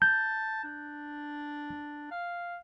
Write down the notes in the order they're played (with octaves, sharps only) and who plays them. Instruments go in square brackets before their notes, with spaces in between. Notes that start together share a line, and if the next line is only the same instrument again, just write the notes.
[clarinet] A5 [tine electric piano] G6
[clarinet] D4
F5